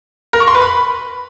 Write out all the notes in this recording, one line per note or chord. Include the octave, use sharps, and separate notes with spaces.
A#4
C#6
C6
B4
B5